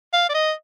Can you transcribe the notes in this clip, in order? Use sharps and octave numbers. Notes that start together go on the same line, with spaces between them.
F5
D5
D#5